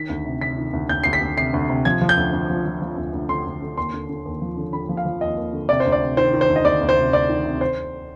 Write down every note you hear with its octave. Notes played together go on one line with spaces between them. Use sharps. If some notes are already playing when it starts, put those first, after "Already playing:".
Already playing: D#3 B6
D2
C3
C3 B6
D#3
D2
D2 G6
D2 C7
B6
D2
C3 C7
D2
C3
F3 G#6
F3
G6
D2
D2
F3
F3
F3
D2
D2
D3 C6
D2
D3
D#2 C6
D3
D3
D#2
F3
D3
D3 B5
F3
F5
F3
D#2 D#5
D#2
D3
C3 D5
C5
D2
D5
C3
D#3 C5
D#3
C5
D2
D#5
D2 D5
D2
C5
C3
D2 D5
D#3
C3
C5